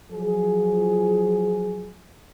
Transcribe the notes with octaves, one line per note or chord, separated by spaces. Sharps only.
F3 F#3 G#4